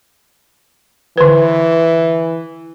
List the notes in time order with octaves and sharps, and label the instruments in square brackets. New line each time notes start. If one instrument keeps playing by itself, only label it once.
[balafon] D3 B4 [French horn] E3